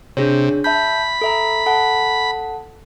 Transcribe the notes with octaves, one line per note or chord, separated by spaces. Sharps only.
C3 D4 G#4 C#5
E5 A5 B5 G6
A4 E5 A#5
A4 F#5 A5